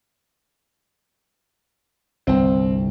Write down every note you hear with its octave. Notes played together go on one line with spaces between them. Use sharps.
G1 C2 C4